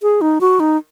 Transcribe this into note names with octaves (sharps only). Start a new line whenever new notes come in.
G#4
D#4
F#4
D#4